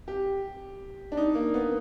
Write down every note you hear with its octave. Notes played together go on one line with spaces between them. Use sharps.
G4
D4
D#4
A#3
B3